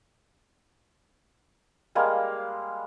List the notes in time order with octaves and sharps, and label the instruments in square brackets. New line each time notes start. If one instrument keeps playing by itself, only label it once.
[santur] G3 G#3 A#3 F5